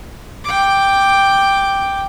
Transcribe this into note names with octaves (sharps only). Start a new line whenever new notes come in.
G5 D6